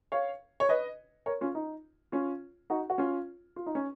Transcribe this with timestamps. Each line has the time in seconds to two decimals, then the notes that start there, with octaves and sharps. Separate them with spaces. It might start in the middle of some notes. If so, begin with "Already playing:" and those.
0.12 C#5 F5
0.60 C#5
0.69 B4 D#5
1.26 A#4 C#5
1.41 C#4 F4
1.55 D#4
2.12 C#4 F4
2.70 D#4 F#4
2.90 F#4
2.98 C#4 F4
3.56 F4
3.66 D#4
3.75 C#4